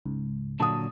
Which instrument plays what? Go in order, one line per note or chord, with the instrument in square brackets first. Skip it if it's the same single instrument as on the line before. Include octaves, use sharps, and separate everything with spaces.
[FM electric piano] C#2 G#2
[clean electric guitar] A#2 D3 F#3 [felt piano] A5 D#6